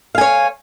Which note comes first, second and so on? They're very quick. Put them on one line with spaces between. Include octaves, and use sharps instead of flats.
F5 G#5 C#5